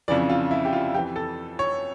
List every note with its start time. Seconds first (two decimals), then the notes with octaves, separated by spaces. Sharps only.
0.08 F2 C#3 E3 D5
0.30 F4
0.51 E4
0.65 G4
0.73 F4
0.94 F2 G4
0.98 E3
1.16 A4
1.59 C#5